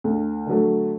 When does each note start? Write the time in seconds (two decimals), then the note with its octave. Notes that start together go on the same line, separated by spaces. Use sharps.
0.04 D2
0.47 D3 F#3 A3